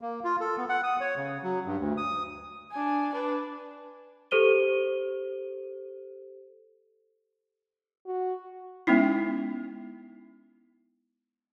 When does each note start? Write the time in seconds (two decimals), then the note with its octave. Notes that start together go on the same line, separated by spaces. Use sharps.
0.01 A#3
0.25 F4
0.41 A4
0.58 B3
0.69 F#5
0.83 D#6
1.01 C#5
1.17 C#3
1.43 F#3
1.66 G2
1.80 D2
1.97 D#6
2.72 D4 G#5
3.13 D4 B4
4.31 G4 A4 C5 D#7 G7
8.06 F#4
8.87 G#3 B3 C#4 D#4 E4